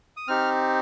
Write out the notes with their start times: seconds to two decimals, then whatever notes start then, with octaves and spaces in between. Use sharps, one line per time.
0.17 D#6
0.28 C4 D#4 G4 F6